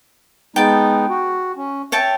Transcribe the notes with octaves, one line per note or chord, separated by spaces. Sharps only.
G#3 B3 D#4 G5 A5
F#4
C#4
C#5 E5 G5 A5